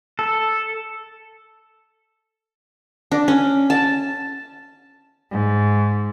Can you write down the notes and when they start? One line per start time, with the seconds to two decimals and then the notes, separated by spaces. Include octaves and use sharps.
0.19 A4
3.11 D4
3.28 C#4
3.70 A5
5.30 G#2